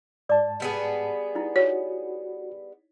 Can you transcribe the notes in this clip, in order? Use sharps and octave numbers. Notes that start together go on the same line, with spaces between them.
G#2 D5 A5 D6
G3 B3 G#4
D#4 E4
F#4 C#5